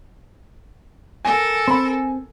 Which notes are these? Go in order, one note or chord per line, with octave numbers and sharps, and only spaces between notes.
A4 A#4 G#5
C4 B5 C6